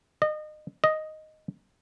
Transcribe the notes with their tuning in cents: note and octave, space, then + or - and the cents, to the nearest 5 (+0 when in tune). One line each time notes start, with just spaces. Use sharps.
D#5 -30
D#5 +0